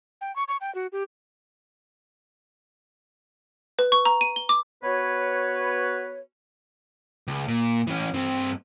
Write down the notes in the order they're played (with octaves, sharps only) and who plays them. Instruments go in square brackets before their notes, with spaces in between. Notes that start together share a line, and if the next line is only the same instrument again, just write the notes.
[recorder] G5
C#6
C#6
G5
F#4
G4
[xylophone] B4
C#6
A#5
D#7
G7
D6
[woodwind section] B3 F#4 B4 C#5
[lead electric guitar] C#2
A#2
E3 C#4
G2 C4